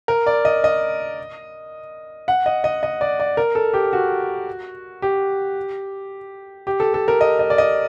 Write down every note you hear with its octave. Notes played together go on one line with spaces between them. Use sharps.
A#4
D5
D#5
D#5
F#5
D#5
D#5
D#5
D5
D5
A#4
A4
G4
F#4
G4
G4
A4
A4
A#4
D#5
D#5
D5
D#5